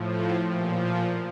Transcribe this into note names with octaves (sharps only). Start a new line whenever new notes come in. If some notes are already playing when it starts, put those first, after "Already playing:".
Already playing: A2 F3
A4
A#2 F3 G4
F4